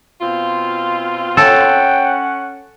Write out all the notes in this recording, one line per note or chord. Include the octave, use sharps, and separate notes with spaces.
B2 C4 F4
C#4 A4 F#5 G5